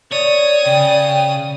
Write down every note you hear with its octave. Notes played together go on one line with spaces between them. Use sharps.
C#5 D5 D#6
C#3 G5